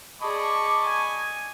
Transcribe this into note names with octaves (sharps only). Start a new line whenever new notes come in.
G#4 D5 D#5 A5 B5 C#6 D6
G#5